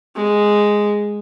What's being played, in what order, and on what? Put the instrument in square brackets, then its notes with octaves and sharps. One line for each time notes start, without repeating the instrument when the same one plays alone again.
[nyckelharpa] G#3